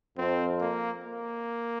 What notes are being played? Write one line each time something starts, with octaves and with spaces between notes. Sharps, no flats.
F2 C4
A#3
A#3